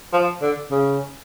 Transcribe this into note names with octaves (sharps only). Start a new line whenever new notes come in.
F3
D3
C#3